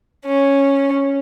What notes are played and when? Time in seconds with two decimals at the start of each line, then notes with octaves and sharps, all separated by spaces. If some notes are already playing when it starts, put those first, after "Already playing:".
0.26 C#4